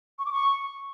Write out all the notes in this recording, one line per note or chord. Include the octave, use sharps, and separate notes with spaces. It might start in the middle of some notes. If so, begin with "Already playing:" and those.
C#6
D6
C#6